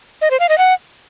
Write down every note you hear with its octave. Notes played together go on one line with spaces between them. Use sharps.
D#5
C5
F5
D#5
F#5